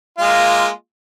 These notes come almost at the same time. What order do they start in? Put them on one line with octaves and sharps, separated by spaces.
F4 G#3 A#3